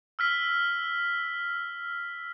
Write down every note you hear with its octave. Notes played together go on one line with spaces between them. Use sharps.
E6 F6 B6